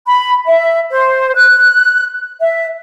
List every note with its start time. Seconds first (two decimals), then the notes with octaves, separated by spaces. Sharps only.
0.06 B5
0.46 E5
0.91 C5
1.35 F#6
2.40 E5